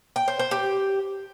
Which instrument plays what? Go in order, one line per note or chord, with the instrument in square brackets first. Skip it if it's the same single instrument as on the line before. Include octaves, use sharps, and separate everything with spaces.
[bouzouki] G5
C5
C5
G4